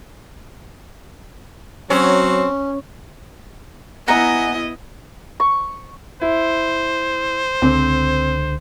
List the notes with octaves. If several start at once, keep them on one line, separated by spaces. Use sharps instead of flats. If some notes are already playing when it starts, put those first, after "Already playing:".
F#3 C4 C#4
B3 E4 D#5 E5 F#5 G#5 A#5
C#6
E4 C5
C#2 D3 C4